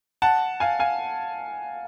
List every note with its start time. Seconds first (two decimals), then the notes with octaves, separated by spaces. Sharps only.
0.22 F#5 A5
0.60 F5 G#5
0.79 F5 G#5